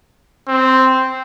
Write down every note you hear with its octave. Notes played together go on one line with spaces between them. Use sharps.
C4